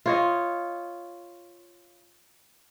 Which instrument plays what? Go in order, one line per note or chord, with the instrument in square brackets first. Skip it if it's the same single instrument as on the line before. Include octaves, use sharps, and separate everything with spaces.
[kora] F4 C#5 D#5